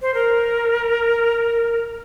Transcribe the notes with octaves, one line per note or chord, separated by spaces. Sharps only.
C5
A#4